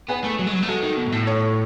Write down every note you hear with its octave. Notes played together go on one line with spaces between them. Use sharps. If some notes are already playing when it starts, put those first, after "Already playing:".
B3 G#4 B4
A3
F#3
G#3
F#3
A3
G#3 F#4 A4
D#3
B2
G#2
A2
A4 C#5